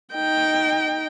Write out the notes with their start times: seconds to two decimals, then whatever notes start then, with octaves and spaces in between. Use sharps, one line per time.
0.14 D#4 G5